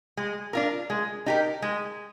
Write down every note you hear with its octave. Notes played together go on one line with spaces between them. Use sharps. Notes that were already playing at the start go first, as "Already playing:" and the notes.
G#3
D4 F4 A#4
G#3
D#4 G4 A#4
G#3